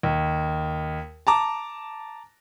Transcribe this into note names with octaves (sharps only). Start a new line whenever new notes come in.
D#2
A5 A#5 D6